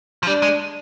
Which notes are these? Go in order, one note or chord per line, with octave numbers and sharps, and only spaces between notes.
F3
G3 D4
G#3